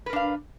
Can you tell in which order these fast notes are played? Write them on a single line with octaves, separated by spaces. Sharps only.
B4 A#4 D4 F5